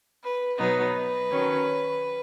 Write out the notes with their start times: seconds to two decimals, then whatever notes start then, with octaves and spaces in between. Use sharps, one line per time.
0.23 B4
0.58 B2 F#3 B3 D#4 B4
1.30 D#3 F#3 C#4